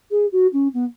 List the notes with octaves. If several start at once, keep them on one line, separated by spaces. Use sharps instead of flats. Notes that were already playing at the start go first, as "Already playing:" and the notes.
G#4
F#4
C#4
B3